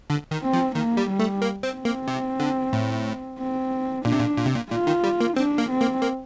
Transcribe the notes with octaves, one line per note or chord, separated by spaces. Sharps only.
D3
D#3
C4
F3
D#3 A#3
G3
G3
A3
A#3
C4
C4
A#3
C3
D3
A2
C4
A#2 D4
C3
A#2
A#2
C3
A#2
A#2 F4
D#3
G3
A#3
C4 D4
A#3
C4
A#3
A#3